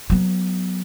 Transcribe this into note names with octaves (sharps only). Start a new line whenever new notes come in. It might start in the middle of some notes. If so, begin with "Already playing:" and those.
F#3 B3